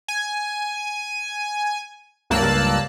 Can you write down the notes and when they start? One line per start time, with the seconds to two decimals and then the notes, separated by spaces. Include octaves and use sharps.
0.08 G#5
2.30 C#2 G2 A#3 A5 E6 F#6